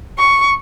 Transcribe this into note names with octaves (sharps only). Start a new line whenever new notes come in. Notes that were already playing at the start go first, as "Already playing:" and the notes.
C#6